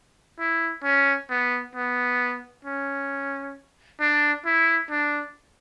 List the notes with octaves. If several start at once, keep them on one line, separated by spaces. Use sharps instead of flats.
E4
C#4
B3
B3
C#4
D4
E4
D4